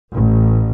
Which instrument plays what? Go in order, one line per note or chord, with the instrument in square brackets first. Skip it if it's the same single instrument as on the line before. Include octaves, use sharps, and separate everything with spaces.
[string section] A1